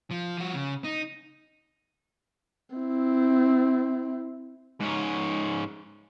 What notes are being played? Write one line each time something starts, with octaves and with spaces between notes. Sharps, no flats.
F3
F3 F#4
C#3
D#4
C4 E4
G#2 C#4